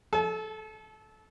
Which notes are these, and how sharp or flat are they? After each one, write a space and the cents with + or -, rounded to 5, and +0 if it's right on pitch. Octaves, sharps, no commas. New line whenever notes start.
A4 -20 A5 -45